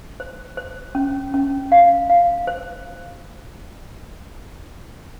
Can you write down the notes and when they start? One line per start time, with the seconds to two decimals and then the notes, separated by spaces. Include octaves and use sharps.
0.20 C5
0.57 C5
0.95 C#4
1.34 C#4
1.72 F5
2.09 F5
2.47 C5